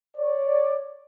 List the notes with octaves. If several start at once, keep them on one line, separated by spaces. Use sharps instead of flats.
C#5 D5